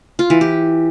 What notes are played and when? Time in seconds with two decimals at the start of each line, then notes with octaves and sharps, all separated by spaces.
0.19 F4
0.30 E3
0.41 G4